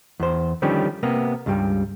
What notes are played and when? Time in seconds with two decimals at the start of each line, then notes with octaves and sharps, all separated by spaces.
0.20 E2 C5
0.62 D3 D#3 F3 G3 C#4
1.03 C3 A#3 B3
1.46 C#2 G2 G3